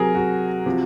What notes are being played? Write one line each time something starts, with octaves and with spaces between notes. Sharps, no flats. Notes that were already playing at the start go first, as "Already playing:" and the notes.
Already playing: C3 F#3 G#4 A#4
F#4
C3 F3